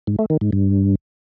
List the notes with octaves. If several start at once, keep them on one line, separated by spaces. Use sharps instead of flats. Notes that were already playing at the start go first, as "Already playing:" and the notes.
G#2
A3
D#3
G#2
G2